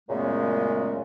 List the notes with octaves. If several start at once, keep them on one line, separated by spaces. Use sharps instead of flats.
F#2 A#2 C#3 G#3 A3 B3